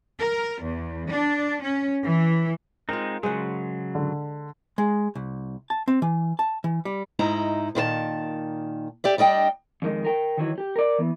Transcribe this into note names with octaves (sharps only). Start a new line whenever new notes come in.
A#4
E2
D4
C#4
E3
G#3 C4 D#4 F4 A#4
C#3 F#3 G#3 C5 F#5
D3
G#3
C2
A5
C4
E3
A5
E3
G3
G#2 D#4 E4 A#5
A#2 D#3 B4 A5
G4 D5 E5
G3 D4 D#5 G5
F2 D#3 G#3
A#4 G5
D#3 E3 F#3
G4
A#4 D5
E3 B3